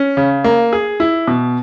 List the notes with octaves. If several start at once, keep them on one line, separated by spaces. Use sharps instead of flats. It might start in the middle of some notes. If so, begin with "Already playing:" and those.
Already playing: C#4
C#3
A#3
G#4
E4
B2